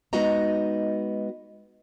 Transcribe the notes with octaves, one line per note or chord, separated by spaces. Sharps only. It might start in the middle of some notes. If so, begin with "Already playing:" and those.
G#3 B3 D#4 F#4 D#5 A#5